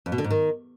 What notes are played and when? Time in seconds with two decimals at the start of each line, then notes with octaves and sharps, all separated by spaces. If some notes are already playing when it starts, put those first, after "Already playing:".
0.06 F2
0.12 B2
0.18 D3
0.24 G#2
0.31 D#3